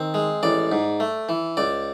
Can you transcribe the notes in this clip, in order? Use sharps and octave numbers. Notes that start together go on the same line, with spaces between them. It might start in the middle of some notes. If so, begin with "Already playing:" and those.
Already playing: D#3 C4
G#3
A1 D5
G#2
A3
E3
C#2 D5